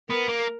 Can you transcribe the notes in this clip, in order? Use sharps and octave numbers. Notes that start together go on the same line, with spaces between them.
B3 A#4
A#3